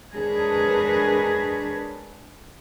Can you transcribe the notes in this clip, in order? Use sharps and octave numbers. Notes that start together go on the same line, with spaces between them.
G#3 D4 G#4 A#4 B4 C#5